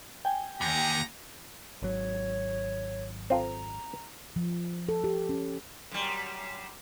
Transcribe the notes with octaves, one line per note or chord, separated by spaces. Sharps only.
G5 G#5
D#2 G4 F#5 A#5
G#1 F#3 C#5
C4 F4 A4 A#5
F3
A4
G4
C#4
F#2 G3